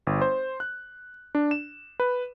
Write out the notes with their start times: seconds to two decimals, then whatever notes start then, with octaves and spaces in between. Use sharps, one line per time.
0.07 G1
0.21 C5
0.60 F#6
1.35 D4
1.51 E7
2.00 B4